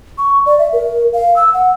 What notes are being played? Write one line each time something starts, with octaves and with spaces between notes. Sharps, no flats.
C#6
D5
E5
A#4
F5
E6
F#5